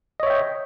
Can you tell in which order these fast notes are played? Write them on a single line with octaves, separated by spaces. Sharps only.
D#5 C#5 E5 G5